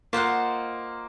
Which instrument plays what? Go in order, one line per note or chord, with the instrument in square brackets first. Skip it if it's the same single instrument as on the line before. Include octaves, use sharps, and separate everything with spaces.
[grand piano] A#3 [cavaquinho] F4 C5 D#5 F#5